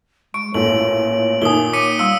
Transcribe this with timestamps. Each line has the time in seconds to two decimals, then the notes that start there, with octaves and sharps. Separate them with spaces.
0.34 G#3 C#6 D7
0.54 A1 A#2 A3 C#5 F#7
1.42 A#2 D#3 E5 G#5 D#6 G7
1.73 C#5 D6 B6 C#7 D#7
1.99 G3 F5 C6 D#6 E6